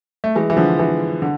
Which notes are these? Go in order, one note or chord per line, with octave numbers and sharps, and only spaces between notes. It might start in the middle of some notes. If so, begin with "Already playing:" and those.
A3
E3 G#3
E3
D3 F3
E3
D3